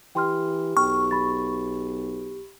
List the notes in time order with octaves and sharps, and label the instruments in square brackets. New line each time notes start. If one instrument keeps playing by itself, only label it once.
[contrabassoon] E3 [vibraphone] G4 [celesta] G5 C6 F6
[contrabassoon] B1 [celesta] G5 F6 [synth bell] C#6
[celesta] B5 A6